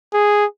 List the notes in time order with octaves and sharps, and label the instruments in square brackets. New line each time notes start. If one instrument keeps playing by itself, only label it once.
[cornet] G#4